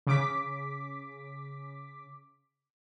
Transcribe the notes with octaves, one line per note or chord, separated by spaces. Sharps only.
C#3 D6 B6